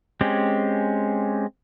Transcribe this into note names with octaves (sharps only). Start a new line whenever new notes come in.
G#3 C4 C#4 G4